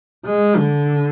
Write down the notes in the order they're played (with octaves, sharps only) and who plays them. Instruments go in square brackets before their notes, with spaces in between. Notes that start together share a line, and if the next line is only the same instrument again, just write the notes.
[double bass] G#3
D3